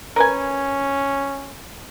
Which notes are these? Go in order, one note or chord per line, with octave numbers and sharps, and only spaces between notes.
C#4 A#4 B4 G#5